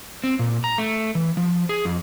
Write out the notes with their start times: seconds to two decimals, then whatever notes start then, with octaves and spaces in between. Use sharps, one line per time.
0.24 C4
0.39 A#2
0.64 A#5
0.78 A3
1.15 E3
1.37 F3
1.69 G#4
1.85 F2